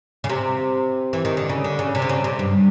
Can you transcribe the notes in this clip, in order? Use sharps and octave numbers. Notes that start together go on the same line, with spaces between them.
C#3
C3
E3
D#3
D3
C#3
D3
C#3
C3
D3
C#3
C3
G2